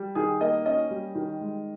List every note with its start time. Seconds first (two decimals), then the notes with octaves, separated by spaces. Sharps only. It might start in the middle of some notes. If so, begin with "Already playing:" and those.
Already playing: G3
0.15 D#3 G#4
0.41 A#3 D#5
0.66 C#4 D#5
0.91 G3
1.15 D#3
1.41 G#3